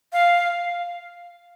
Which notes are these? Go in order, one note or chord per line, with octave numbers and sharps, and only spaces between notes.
F5